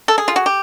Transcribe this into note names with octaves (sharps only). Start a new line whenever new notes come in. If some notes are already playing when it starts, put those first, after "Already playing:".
A4
G#4
F4
F#4
G4